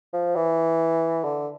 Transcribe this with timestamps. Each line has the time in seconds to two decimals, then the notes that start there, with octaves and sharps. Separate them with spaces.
0.13 F3
0.36 E3
1.24 D3